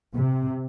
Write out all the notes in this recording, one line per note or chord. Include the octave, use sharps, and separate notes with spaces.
C3